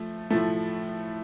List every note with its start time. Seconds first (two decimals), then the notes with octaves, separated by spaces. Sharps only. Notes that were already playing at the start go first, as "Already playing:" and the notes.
Already playing: F3 A3
0.30 A2 F3 A3